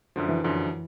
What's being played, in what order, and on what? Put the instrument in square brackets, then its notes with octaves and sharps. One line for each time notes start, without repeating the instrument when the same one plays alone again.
[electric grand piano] F#2 D3 F3
[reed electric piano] E3
[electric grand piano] F#2 D3 F3